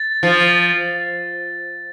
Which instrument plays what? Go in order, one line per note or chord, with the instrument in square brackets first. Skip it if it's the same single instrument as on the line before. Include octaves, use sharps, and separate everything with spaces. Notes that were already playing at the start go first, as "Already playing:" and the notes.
Already playing: [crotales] A6
[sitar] F3